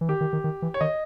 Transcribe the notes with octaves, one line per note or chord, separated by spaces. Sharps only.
E3
D#3 G4
D#3
D#3
D#3
E3
C#5
D#3 D#5